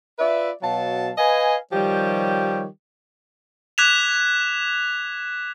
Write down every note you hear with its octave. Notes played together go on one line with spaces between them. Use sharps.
F4 B4 D5 E5
B2 F#3 F5 A5
B4 D#5 F5 G#5
D#3 F3 G3 G4 C#5
D6 F#6 G#6 B6 E7 F7